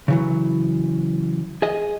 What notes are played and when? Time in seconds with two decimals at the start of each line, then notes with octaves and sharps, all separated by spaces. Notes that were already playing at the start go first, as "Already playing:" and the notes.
0.08 C#3 E3 F#3
1.62 G#4 D#5